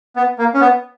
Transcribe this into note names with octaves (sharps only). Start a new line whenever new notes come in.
B3
A#3
C#4
B3